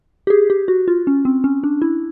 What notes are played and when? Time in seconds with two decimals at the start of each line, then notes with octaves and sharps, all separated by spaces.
0.27 G4
0.30 G#4
0.50 G4
0.68 F#4
0.88 F4
1.07 C#4
1.25 C4
1.44 C#4
1.64 D4
1.82 E4